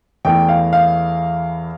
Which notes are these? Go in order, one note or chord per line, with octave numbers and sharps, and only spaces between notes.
E2 E3 A3 G5
F5
F5